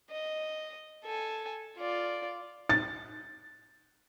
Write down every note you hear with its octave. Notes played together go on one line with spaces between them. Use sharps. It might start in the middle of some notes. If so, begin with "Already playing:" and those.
D#5
A4 G#5
F4 D5
A6